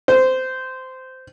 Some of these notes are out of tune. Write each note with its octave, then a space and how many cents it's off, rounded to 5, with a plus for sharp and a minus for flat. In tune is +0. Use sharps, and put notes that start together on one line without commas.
C5 -15